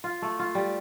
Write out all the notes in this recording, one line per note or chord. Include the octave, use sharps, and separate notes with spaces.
F4
A3
F4
G3